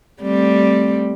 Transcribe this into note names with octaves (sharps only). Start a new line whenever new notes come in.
G3 A3 C4